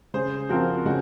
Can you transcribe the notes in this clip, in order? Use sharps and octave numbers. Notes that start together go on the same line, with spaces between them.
C#3 G#4 C5
F3 C4 F4 F#4 A#4
C#3 D#4 F#4